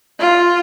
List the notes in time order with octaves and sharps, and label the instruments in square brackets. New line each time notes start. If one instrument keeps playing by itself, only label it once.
[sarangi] F4